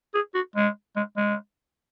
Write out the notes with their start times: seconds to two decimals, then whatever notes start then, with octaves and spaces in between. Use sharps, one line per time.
0.14 G#4
0.35 F#4
0.56 G#3
0.96 G#3
1.17 G#3